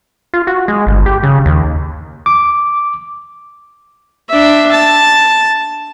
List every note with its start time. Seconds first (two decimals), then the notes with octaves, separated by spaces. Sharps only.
0.34 F4
0.47 F#4
0.68 G#3
0.87 G1
1.06 G4
1.23 C#3
1.46 D#2
2.26 D6
4.28 D4 E5
4.71 A5